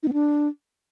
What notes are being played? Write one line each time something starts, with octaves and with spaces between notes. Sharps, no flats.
D#4
B3
D4